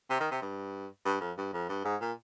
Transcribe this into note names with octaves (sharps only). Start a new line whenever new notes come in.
C3
D#3
C3
G2
G2
F2
G2
F2
G2
G#2
A#2